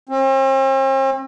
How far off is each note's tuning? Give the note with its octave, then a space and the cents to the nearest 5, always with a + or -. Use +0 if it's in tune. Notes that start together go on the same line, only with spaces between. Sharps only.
C4 +45